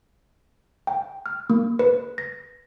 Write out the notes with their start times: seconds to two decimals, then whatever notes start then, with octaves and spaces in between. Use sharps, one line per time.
0.87 G5
1.26 F6
1.50 A#3
1.79 B4
2.18 A#6